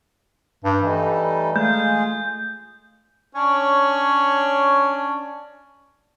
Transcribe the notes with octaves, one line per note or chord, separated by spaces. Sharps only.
G2
E3 G3 A3 D#4
G#3 A3 F4 G#4 G6
C#4 D4 C#5